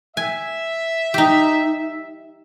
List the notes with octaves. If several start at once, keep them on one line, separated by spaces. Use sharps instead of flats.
E5 G#5
D#4 G4